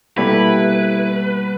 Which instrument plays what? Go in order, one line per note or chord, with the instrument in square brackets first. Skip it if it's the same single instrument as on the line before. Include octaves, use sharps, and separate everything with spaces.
[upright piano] B2 A#3 A4 [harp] G3 [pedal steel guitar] E4 [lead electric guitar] B4